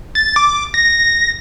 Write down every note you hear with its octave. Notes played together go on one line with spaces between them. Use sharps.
A6
D6
A#6